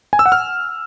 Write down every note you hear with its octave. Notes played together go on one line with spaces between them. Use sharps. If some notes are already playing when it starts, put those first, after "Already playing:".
G#5
E6
F#5
F6